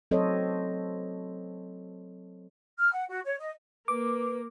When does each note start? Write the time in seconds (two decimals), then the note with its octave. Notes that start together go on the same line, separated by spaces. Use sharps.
0.11 F#3 C4 A4 C5 C#5 D#5
2.79 F6
2.94 F#5
3.10 F#4
3.25 C#5
3.39 D#5
3.88 A#3 B4 D6